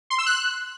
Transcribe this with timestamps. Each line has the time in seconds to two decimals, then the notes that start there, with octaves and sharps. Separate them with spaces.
0.10 C6
0.18 E6
0.26 F#6